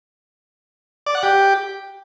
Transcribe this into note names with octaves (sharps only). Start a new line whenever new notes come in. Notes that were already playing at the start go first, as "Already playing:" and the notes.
D5
F#5
G4